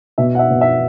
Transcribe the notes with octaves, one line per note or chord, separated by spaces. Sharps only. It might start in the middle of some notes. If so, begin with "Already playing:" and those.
B2 E5
F#5
E5
B2
E5